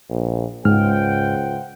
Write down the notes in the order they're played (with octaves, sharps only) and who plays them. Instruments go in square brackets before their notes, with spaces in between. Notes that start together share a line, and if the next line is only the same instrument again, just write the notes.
[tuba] A#1
[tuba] C#2 [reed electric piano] G#2 F6 [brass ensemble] C5 F#5 G5